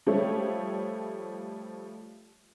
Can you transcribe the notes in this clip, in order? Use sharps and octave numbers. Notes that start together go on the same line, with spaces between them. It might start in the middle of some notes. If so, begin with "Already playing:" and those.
F3 G3 A3 A4 C#5 E5